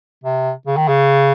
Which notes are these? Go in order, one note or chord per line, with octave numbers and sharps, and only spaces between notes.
C3
C#3
D#3
C#3